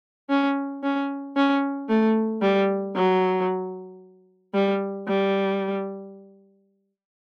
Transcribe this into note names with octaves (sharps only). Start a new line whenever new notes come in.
C#4
C#4
C#4
A3
G3
F#3
G3
G3